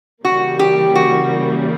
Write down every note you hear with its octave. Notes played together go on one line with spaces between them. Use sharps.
C#3 E3 G3 A#3 F#4
G4
F#4